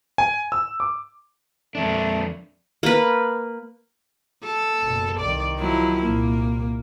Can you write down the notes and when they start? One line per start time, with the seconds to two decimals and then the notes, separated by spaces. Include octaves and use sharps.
0.18 G#5
0.52 E6
0.80 D6
1.75 F2 A3 D4
2.83 A#3 B4
4.44 A4
4.81 F#1 B2
5.20 C2 D#3 D5
5.58 F3 F#3 E4
6.03 C2 A#2 A#3